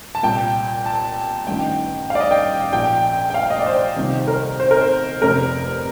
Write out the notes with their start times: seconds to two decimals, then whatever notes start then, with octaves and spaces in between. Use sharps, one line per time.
0.15 A5
0.23 C2 A#2 G5
0.86 A5
1.47 A1 G2 D#3 G5
2.10 F5
2.15 D5
2.20 D#5
2.31 G5
2.73 A#1 A#2 G5
3.30 G5
3.34 F5
3.50 D#5
3.59 D5
3.66 C5
3.96 C2 C3 D#3
4.28 A#4
4.60 C5
4.71 A#4
4.81 C5
5.22 F1 F2 C3 A#4